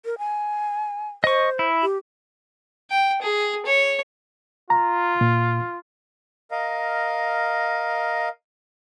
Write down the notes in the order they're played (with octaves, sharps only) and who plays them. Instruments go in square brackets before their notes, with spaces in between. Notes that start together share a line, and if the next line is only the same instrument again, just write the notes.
[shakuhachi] A#4
G#5
[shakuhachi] C5 [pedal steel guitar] D#5 C#6
[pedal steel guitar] E4
[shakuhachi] G4
[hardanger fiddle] G5
G#4
C#5
[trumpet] F4 [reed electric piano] A#5
[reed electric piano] A#2
[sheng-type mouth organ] A#4 D#5 F5